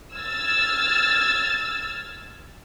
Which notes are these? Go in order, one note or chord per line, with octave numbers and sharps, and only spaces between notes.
E6 F6 G#6 A6